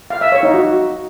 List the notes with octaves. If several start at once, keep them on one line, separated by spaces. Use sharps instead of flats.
F5
E5
C#5
D#4
F#4